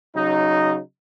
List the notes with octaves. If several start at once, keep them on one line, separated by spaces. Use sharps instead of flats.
C#3 F#3 D#4